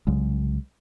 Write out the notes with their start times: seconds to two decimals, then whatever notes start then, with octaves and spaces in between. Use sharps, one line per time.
0.07 C2 C#3 F#3 G#3